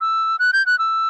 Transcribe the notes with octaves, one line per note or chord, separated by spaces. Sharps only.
E6
F#6
G6
F#6
E6